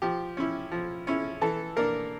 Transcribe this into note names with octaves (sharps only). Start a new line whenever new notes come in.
F3 G4
C#4 E4
F3
C#4 E4
E3 A4
A#3 D4 A#4